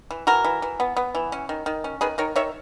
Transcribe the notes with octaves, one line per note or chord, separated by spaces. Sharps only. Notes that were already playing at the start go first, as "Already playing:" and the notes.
E3
E3 F#4 A#4
E3
E3
B3
B3
E3
C#4
D#3
D#3
C#4
D#3 G#4 B4
D#3 A#4 C#5
D#3 C#5 E5